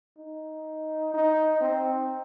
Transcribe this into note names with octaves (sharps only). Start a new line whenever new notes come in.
D#4
D#4
C4